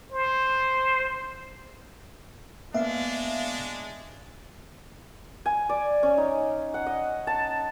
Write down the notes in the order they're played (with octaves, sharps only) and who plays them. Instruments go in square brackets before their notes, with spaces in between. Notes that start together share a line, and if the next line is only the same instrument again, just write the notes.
[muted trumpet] C5
[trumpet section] G#3 D4 [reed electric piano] A#3 B3 [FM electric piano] E5 F5 C7
[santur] G#5
D5
C#4
D#4
F#5
D#5
A5